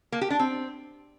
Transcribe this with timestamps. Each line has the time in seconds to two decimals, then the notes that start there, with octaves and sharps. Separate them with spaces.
0.12 A#3
0.21 G4
0.30 D4
0.39 C4